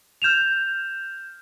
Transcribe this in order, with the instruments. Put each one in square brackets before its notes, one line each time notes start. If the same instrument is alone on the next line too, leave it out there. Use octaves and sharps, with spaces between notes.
[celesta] F6 G6 E7 F7